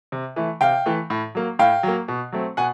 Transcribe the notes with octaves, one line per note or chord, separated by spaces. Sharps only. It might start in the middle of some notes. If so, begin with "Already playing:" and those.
C3
E3 A3
C3 F5 G5
E3 A3
A2
F#3 A#3
A2 F5 G5
F#3 A#3
B2
F#3 A3 C4
B2 F#5 G#5